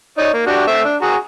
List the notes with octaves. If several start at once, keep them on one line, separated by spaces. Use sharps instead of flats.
D#4 C#5 D5
A#3
D4 F#4 G4
A3 C4 E5
D4
F#4 G#4 A#5